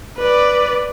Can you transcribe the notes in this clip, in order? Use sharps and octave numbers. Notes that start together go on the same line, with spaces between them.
B4 D5